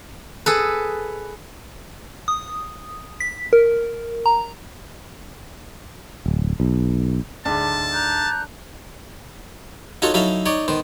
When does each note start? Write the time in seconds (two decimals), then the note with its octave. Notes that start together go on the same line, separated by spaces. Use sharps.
0.46 G#4 A4 B4
2.28 D#6
3.20 B6
3.53 A#4
4.26 A#5
6.26 D1
6.60 B1
7.45 D2 G#2 D4 A5
7.93 A#5 F#6 G6
10.02 D#4 F4 F#4 A4 C#5
10.14 F#3 D#4 E4 A4 E5 F5
10.46 D#4 C#5 D5
10.68 D#3 B3 C5